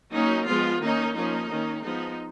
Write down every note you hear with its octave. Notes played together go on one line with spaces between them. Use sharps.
F#3 A#3 C#4 D#4
F3 G#3 B3 F4
D#3 A#3 C#4 D#4
F3 A#3 C#4 D#4
D#3 A#3 C#4
F3 G#3 B3 D#4